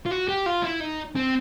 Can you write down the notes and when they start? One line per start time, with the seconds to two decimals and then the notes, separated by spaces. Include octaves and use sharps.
0.06 F4
0.11 F#4
0.28 G4
0.46 F4
0.64 E4
0.81 D#4
1.16 C4